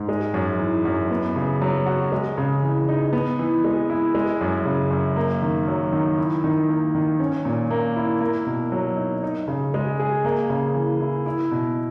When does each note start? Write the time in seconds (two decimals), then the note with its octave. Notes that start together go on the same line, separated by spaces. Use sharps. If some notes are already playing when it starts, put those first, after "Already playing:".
Already playing: G#2
0.09 G#3
0.34 F#2
0.59 E3
0.85 F#2
1.11 B3
1.36 C#3
1.61 F#3
1.86 F#4
2.12 G#3
2.38 C#3
2.63 E3
2.89 D#4
3.13 B3
3.39 E3
3.64 G#3
3.90 E4
4.15 G#3
4.41 F#2
4.66 C#3
4.91 F#2
5.16 A#3
5.42 D#3
5.68 F#3
5.93 D#3
6.18 E4
6.44 D#3
6.69 A#3
6.95 D#3
7.20 C#4
7.45 A#2
7.70 A#3
7.96 E4
8.21 A#3
8.47 B2
8.72 F#3
8.97 D#4
9.23 D#4
9.48 C#3
9.74 G#3
9.99 G#4
10.25 A#3
10.50 C#3
10.74 E3
11.01 E4
11.26 E4
11.51 B2